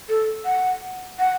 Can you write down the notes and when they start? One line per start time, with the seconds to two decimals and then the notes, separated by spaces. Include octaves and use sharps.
0.09 A4
0.45 F#5
1.19 F#5